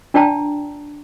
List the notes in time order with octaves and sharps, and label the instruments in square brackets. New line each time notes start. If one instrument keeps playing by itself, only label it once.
[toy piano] D4 F4 D5 G5 A5 A#5